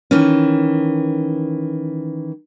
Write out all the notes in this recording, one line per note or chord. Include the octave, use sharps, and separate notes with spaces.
D#3 E3 C#4